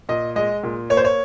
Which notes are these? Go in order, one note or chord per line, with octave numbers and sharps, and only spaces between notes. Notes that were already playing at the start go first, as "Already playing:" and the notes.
A#2 D#5
G#3 D#5
A#2
A#3 C#5
C5
C#5